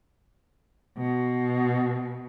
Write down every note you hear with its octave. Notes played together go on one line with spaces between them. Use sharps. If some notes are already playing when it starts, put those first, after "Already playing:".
B2